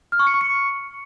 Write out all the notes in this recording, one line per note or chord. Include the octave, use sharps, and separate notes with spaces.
F6
C#6
C#7
C#6
C#7